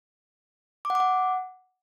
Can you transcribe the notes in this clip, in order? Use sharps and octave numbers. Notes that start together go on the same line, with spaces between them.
D6
F#5
D6
F#5